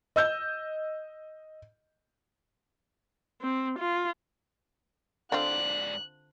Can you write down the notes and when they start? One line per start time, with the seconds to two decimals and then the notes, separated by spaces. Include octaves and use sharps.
0.16 D#5 E6 G6
3.41 C4
3.79 F4
5.32 G#2 D3 C4 F4 D5 F#6